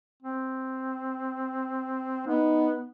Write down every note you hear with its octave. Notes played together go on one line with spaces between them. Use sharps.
C4
B3 D#4